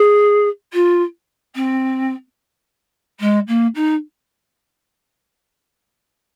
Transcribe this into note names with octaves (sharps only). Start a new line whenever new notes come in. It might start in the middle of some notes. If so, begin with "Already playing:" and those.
Already playing: G#4
F4
C4
G#3
A#3
D#4